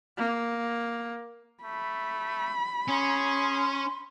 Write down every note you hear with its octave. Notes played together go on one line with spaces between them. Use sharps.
A#3
A3 B5
C#4 G#4 C6